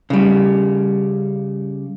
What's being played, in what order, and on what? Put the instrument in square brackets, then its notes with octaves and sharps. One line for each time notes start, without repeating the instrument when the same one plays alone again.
[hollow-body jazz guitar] C#3 G3